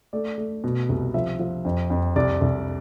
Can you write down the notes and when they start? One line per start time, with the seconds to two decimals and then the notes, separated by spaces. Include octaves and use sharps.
0.13 A3 D5
0.38 A3
0.64 B2
0.89 C2
1.14 F3 E5
1.39 F3
1.65 F2
1.90 F2
2.16 C2 D5
2.41 C2